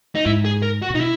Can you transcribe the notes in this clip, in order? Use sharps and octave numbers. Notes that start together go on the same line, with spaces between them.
D#4
G#2 E4
G#4
A#4
F#4
B2 D#4
E4